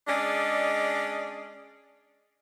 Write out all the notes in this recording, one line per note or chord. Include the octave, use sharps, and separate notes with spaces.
G#3 C#4 D4 G#4 D5 D#5